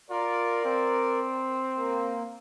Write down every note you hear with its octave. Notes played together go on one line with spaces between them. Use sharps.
F4 A#4 D5
C4
A#3